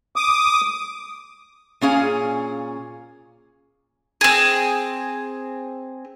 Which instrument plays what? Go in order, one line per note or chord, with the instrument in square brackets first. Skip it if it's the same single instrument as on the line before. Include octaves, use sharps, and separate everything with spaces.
[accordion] D6 D#6
[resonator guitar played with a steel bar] A#2 C#4 G#4 F5
[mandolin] C4 G#4